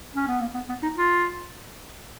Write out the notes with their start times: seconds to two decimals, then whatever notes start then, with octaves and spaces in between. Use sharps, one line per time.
0.15 C#4
0.28 B3
0.41 A#3
0.54 B3
0.69 B3
0.83 D#4
0.97 F4